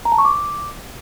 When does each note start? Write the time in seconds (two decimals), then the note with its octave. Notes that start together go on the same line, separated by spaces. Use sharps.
0.05 A#5
0.12 A5
0.18 C#6
0.25 D6